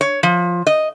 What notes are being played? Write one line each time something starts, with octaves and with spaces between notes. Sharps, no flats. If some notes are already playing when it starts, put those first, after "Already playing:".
C#5
F3
D#5